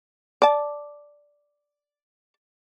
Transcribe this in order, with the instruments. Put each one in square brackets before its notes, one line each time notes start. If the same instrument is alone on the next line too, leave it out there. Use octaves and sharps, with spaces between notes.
[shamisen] D5 A5